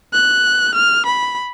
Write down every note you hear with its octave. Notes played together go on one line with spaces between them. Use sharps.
F#6
F6
B5